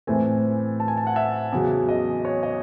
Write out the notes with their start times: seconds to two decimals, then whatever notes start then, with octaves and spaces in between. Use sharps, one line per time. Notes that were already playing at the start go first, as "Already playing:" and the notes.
0.07 A2 E3 A3 C4 G#5
0.80 A5
0.88 G#5
0.97 A5
1.07 F#5
1.16 E5
1.52 E2 C#3 F#3
1.89 D#5
2.25 C#5
2.43 D#5